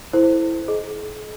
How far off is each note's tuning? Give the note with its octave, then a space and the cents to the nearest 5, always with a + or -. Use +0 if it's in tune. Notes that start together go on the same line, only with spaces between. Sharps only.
E4 +0 A4 +0 C5 +0
G#4 +45 D#5 +0